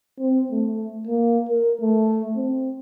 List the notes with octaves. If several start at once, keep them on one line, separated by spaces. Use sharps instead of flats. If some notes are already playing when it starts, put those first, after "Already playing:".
C4
A3
A#3
A#4
A3
C4